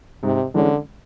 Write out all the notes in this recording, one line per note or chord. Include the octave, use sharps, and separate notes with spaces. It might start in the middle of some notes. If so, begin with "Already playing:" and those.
G#2 C3
D3 E3 G#3 C#4